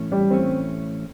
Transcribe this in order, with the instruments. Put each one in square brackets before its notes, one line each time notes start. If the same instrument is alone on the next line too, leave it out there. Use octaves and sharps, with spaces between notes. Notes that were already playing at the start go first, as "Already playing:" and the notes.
Already playing: [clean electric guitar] A2 E3 A3 C#4
[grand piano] G3
[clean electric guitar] A2 E3 A3 C#4 [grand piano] C4